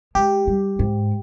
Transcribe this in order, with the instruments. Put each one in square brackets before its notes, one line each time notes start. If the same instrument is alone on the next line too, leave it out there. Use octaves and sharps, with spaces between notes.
[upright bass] G#3 [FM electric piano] G4
[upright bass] G3
G#2